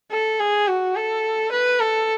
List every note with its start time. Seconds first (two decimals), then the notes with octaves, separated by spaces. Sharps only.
0.11 A4
0.40 G#4
0.68 F#4
0.96 A4
1.52 B4
1.80 A4